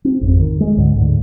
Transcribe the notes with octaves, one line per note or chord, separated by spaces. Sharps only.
C4
G#1 F2
D#3
G#3
C#2 G#2 D3
D2 G#2